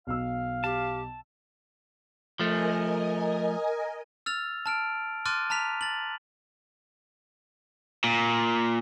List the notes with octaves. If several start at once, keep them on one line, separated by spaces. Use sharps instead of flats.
B1 F5 E6
G4 A5
F3 A3 A#4 D#5 G#5
E6 F6 A6 F7
A5 F6 D7
C6 D6 F6 F#6 A6 D#7
A5 A#5 F6 B6 F7
A6 F#7
A#2